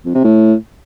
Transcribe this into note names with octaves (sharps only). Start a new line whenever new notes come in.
F2
C3
A2